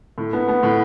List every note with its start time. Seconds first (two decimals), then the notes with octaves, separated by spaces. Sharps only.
0.18 A2
0.33 B3
0.48 B3
0.63 A2